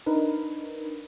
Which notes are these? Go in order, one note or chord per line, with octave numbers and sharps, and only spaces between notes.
D4 D#4 A#4 B4